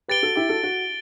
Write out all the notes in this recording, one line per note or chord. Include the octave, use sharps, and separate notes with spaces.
G4 B4 A6 D7 G7
F#4 A4
E4 G4
F#4 A4
F#4